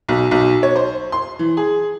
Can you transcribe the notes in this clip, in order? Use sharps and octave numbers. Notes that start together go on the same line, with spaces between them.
B1
B1
C#5
C5
C6
E3
G#4